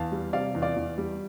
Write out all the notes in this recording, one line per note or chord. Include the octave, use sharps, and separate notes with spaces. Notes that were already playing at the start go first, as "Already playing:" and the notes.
Already playing: E2 F5 A5
G3
C3 D5 F5
E2
D5 F5
E2
G3